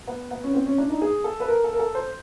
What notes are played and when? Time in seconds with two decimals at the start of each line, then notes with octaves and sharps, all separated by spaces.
0.07 B3
0.31 B3
0.44 C#4
0.54 C4
0.66 C#4
0.78 D4
0.90 D#4
1.01 G#4
1.24 A4
1.40 B4
1.48 A#4
1.64 A4
1.73 A#4
1.79 A4
1.95 C5